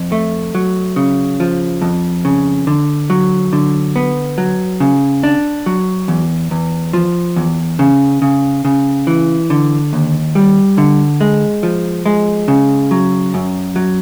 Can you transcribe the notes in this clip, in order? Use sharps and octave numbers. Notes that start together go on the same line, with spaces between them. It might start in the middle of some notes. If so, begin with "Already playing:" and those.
Already playing: F2
A3
F#3
C#3
F3
F2
C#3
D3
F#3
D3
B3
F#3
C#3
D4
F#3
E2
E2
F3
E2
C#3
C#3
C#3
E3
D3
D#2
G3
D3
G#3
F3
G#3
C#3
F#3
F#2
F#3